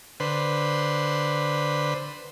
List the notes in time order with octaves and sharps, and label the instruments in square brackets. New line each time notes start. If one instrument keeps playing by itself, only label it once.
[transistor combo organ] D3 B4 C5